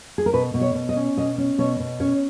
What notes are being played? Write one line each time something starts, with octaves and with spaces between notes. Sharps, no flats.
G#4
A#4
B2 B4
B2
C#5
B2
D#5
C#4
B2 D#5
C#4
B2 C#5
B2
C#4 C#5